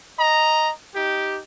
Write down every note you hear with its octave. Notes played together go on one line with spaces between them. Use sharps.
D#5 A#5
D#4 G4